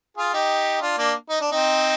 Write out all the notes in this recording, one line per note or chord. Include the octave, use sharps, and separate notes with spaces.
F4 G#4
D#4 G4
D4 F4
A#3 D4
D#4
D4
C4 D#4